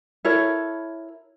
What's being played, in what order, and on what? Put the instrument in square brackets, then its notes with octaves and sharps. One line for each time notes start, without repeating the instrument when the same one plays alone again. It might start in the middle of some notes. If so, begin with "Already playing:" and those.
[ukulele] E4 A4 A#4 C#5